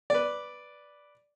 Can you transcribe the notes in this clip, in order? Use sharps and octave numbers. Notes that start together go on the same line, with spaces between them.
B4 D5